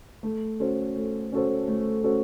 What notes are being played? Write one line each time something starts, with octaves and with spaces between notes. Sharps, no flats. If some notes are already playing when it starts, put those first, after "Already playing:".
A3
C#4 F#4 A4 C5
A3
C#4 F#4 A4 C5
A3
C#4 F#4 A4 C5